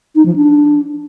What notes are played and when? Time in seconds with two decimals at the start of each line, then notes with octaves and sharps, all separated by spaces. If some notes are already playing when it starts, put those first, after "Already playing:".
0.15 D#4
0.26 F3
0.36 D4